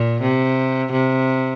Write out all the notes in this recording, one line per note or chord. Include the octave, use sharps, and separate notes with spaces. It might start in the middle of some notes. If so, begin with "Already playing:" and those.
Already playing: A#2
C3
C3